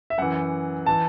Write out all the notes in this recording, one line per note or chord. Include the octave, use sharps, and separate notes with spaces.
E5
F#2 E3 F#5
E3 A5